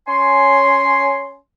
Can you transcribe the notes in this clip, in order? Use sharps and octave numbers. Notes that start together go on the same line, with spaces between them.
C#4 C#5 G#5 C6